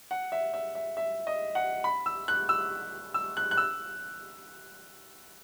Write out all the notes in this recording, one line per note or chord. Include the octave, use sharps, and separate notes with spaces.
F#5
E5
E5
E5
E5
D#5
F#5
B5
E6
F#6
E6
E6
F#6
F#6
E6